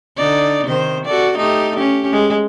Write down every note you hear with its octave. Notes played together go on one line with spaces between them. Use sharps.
D3 D#4 D5
C3 D#3 C5
F#4 A4 D5
A3 D#4 G4
C#4 G4
G#3